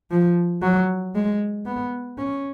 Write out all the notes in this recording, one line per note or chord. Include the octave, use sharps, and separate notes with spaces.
F3
F#3
G#3
B3
C#4